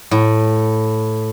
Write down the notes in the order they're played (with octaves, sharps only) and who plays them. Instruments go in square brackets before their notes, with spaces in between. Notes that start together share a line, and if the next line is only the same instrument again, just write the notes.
[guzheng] A2